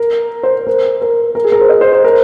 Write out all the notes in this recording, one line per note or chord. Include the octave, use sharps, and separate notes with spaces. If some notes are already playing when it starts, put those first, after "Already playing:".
Already playing: A#4
C5
A#4
A#4
A#4
G#4
A#4
C5
D#5
C5
C5
A#4